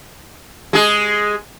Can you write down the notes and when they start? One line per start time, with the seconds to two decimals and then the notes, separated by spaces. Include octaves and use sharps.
0.73 G#3 G#4